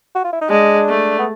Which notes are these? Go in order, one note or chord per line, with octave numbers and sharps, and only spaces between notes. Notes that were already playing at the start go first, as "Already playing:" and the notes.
F#4
F4
E4
D#4
G#3 D4
A3
B3